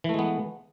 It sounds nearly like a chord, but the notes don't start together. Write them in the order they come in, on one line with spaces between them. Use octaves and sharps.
E3 A3 G#3 B3